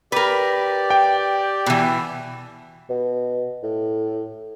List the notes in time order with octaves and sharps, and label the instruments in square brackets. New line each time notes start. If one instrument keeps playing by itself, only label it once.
[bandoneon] G4 D5 [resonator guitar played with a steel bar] A#4 B4
[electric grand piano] G5
[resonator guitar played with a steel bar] B2 E3
[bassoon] B2
A2